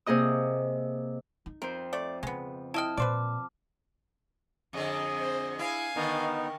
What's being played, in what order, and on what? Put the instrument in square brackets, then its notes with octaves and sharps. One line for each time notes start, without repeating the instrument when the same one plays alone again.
[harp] C3 A#3 G#4 D#5 D#6
[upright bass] D#4
[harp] F2 C5 [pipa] A#4
[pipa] A3 D5
[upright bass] C#3 [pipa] G#3 B3
[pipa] E4 D#5 G5 [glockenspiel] A5 F6
[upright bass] A#2 [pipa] B4 C5 D5 [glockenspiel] D6
[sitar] F2 D3 [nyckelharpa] G#4 D#5
[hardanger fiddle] C5
[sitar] E4 [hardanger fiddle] F5 G#5
[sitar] D3 D#3 [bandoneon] B3 D#4 [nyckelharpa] A#4